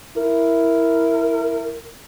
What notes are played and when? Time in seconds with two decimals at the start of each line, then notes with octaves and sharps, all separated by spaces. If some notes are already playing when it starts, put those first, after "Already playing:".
0.17 E4 A#4